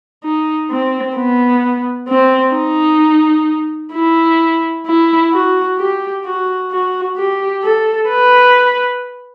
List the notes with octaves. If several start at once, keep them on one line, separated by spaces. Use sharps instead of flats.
D#4
C4
B3
C4
D#4
E4
E4
F#4
G4
F#4
F#4
G4
A4
B4